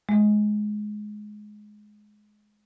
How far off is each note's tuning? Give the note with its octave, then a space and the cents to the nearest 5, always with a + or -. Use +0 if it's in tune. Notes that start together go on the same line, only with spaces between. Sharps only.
G#3 +15